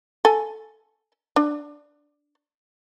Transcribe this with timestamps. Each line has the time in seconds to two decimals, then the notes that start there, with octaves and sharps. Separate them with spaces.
0.25 A4 G#5
1.36 D4